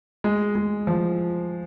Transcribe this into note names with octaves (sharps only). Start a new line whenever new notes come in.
G#3
G#3
F3